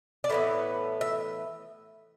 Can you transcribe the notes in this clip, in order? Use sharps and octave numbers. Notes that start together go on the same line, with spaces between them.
D5
A2 E3 B3 E5
E5